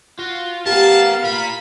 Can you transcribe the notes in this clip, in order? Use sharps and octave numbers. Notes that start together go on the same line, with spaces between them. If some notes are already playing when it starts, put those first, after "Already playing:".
F4 F#4
B3 G4 A#4 F5 A5
F4 A#4 B5